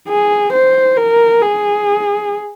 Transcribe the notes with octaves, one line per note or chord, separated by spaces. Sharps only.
G#4
C5
A#4
G#4